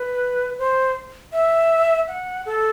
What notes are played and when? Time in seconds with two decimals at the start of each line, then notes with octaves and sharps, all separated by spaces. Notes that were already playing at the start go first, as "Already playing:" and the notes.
Already playing: B4
0.58 C5
1.32 E5
2.08 F#5
2.46 A4